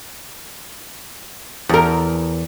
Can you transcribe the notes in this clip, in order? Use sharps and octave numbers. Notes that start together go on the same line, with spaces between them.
E2 A#4